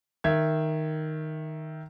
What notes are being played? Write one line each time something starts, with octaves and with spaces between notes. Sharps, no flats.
D#3 E5 G#6